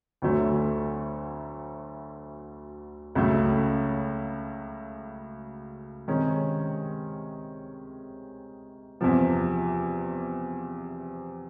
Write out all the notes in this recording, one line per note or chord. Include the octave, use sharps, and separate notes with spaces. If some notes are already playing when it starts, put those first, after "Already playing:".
D2 D3 F#3 A3
C#2 C#3 F#3 A3
C3 D#3 G#3 C#4
E2 C3 F3